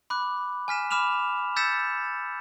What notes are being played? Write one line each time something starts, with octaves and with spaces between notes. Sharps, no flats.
B5 D6 F#6
G#5 F6 B6 E7
B5 D6 F6 E7 F7
E6 G6 A6 B6 C#7 E7